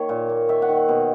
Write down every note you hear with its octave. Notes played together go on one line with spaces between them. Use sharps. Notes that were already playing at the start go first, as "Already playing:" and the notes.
Already playing: D#3 A#3 C#5
A#2
A#3
D#3 E5
F#5
D#3
F#5
B2